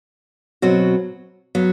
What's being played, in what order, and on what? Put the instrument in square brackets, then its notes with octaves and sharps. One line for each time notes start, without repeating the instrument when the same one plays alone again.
[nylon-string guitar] B2 F#3 C4 F#4
F#3 B3